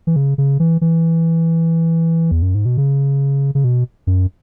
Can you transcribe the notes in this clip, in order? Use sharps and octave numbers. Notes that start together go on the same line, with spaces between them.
E3
C#3
C#3
E3
E3
E2
F#2
G#2
B2
C#3
C#3
B2
F#2